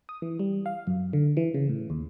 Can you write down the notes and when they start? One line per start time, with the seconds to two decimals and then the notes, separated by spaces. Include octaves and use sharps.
0.09 D#6
0.22 E3
0.39 G3
0.66 F5
0.87 F#2
1.13 D3
1.37 E3
1.54 C#3
1.69 A2
1.90 D#2